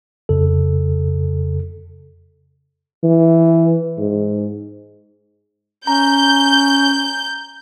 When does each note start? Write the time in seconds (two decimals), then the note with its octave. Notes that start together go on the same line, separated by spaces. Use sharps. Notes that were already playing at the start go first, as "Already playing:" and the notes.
0.29 F2 C#3 A4
3.04 E3
3.98 G#2
5.87 C#4 A#5 G6